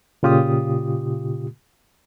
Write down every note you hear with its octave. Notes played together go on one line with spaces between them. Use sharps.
A#2 C#3 F4 G4 D#6